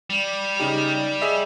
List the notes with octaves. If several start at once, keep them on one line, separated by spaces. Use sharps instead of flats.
G3
C#3 D#4 G4
G#4 D#5 E5